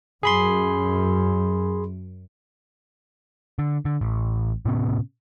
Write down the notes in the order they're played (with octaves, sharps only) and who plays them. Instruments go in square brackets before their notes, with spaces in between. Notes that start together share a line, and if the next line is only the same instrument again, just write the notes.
[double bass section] F#2 [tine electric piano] G#4 B5 C6
[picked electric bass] D3
D3
A1
A2 C3 B3 C#4